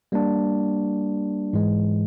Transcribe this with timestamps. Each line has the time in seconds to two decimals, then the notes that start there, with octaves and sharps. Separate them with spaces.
0.12 G3 A#3 D4
1.53 G#2 E3 G#3